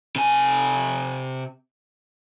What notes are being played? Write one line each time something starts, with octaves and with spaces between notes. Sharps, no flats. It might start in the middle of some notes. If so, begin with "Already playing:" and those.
C3 G#5